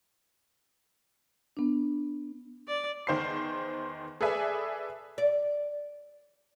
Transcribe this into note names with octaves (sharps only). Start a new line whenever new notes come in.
B3 D4
D5
E2 D#3 C5 C6 C7
G#4 A4 B4 D5 E5 G#5
D5